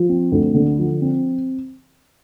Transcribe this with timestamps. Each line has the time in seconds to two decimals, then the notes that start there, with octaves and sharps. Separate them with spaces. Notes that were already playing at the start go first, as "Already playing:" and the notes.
Already playing: F3
0.09 C4
0.32 D2
0.54 D3
0.79 F3
1.01 C4